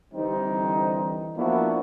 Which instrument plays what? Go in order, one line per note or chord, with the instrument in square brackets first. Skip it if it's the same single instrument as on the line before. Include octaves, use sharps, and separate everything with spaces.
[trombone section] D3 E3 G3 C4 D#4
F3 A#3 B3 D4 E4 F#4